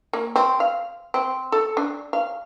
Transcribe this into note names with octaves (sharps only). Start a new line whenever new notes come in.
A#3
C4
F5
C4
A4
D4
F5